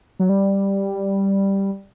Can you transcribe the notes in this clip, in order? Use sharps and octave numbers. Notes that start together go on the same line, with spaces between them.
F#3
G3